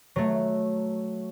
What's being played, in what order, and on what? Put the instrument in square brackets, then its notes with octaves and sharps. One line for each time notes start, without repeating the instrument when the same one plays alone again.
[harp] F#3 A3